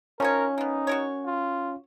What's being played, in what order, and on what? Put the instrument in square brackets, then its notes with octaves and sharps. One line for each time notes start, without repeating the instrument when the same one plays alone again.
[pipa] F3 D#4 C#5 [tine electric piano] C#4 [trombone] A#4
[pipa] A#3 B3 [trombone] D#4
[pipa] F#4 A#4 C#5
[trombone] F4